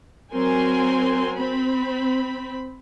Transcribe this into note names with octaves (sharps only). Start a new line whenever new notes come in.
F#3 C4 A#4 G#5 C6
C4 B5